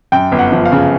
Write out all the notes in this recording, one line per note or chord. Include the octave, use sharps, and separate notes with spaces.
F#2 G5
G1
F#5
F3
F5
C#3